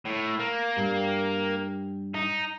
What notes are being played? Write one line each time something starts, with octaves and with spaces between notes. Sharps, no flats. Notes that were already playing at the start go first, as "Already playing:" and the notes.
A2
A#3
G2 G3
D#4